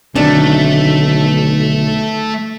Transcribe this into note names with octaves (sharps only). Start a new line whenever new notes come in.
B1 D3 D#3 A3 C4 D4